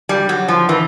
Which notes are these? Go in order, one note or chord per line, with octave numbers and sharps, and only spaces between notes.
G3
F#3
F3
E3